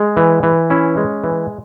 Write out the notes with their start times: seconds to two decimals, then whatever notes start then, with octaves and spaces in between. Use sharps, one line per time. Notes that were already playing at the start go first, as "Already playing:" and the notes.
Already playing: G#3
0.17 E3
0.43 E3
0.70 C#4 E4
0.97 G#3
1.24 E3